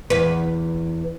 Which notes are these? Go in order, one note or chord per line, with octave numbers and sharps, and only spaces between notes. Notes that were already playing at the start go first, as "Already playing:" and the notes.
E2 B4